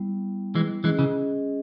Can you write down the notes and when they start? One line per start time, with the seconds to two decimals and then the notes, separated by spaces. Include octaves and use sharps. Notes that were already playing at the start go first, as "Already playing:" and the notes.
Already playing: G3 B3 E4
0.55 E3 G#3
0.84 E3 G#3 C#4 G#4 D#5
0.99 C#3 E3